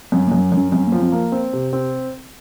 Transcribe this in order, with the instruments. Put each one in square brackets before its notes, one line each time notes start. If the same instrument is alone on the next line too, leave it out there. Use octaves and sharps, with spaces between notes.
[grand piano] F#2 [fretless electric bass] C4
[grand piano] F#2 [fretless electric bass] A#3
[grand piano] F#2
[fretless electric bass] C#4
[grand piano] F#2 [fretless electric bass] C4
[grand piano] F3 [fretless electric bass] A#3
[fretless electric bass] C4
[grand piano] A#3
C4
C3
C4